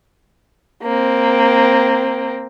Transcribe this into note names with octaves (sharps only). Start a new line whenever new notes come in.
A#3 C4